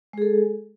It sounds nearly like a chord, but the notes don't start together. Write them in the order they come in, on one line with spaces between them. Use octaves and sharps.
G#3 G#4 A4